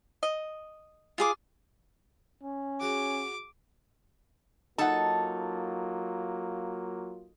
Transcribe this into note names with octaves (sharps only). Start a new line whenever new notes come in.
D#5
F4 G#4 D6
C#4
F#4 G#4 D6
F#3 A#3 D#4 F4 A4 F#5 A5